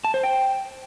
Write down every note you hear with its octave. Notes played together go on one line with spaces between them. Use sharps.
A5
C5
G5